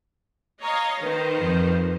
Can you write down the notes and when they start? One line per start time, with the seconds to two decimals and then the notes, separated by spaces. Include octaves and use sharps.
0.63 C#5 D#5 F5 A#5
1.02 D#3 B4 C5
1.38 F2